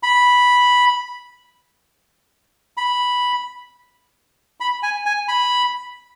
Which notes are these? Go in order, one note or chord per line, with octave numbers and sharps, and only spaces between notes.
B5
B5
B5
G#5
G#5
B5